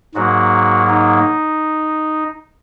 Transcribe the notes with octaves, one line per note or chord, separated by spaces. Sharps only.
G#2 F#3 A#3 F#4
D#4